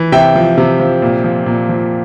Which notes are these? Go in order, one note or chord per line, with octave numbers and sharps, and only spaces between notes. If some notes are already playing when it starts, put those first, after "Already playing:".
Already playing: E3
C3 E5 G5
F3
C3
F3
A#2
F3
A#2
F3